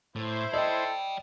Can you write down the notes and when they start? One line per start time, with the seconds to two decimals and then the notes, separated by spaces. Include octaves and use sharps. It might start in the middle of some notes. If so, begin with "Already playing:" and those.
0.16 A2 E4 C5
0.54 A4 D5 D#5 G5